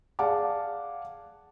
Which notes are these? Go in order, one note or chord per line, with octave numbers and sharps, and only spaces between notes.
G#4 D5 F5 F#5 A5 D6